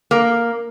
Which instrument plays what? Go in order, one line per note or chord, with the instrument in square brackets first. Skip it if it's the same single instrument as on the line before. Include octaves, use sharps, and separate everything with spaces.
[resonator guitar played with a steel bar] A#3